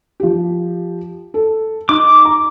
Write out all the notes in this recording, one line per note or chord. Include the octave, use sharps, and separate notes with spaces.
F3 G4
A4
D#4 D6
A#5